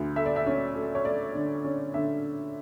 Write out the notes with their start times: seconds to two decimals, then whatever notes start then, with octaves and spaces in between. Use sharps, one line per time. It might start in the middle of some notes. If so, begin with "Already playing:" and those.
Already playing: D2 D3
0.16 A3 E5
0.26 D5
0.36 E5
0.46 C#4
0.75 A3
0.95 C#5
1.05 A3 D5
1.35 D3
1.65 C#4
1.94 D3 E5